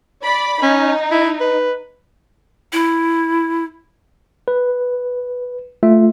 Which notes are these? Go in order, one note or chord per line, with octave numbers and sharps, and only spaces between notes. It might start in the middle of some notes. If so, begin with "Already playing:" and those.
D5 B5
C#4 D#4
E4
B4
E4
B4
A3 F4 E5